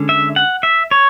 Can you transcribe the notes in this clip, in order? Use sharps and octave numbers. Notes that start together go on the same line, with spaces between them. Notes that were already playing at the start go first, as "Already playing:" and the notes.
Already playing: D3 G#3 C#4
E5
F#5
E5
C#5